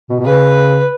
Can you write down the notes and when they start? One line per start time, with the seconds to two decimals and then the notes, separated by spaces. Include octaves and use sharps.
0.10 B2
0.20 B2
0.25 C#3 B4